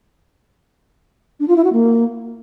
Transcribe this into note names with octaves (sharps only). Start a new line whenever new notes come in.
D4
F4
E4
F#4
A#3